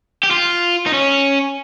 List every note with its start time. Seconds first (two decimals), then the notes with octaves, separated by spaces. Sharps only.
0.23 G4
0.31 F4
0.86 D#4
0.93 C#4